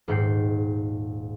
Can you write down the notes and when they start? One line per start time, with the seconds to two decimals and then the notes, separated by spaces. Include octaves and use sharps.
0.08 D#1 G#2 F#5 G5 G6 C7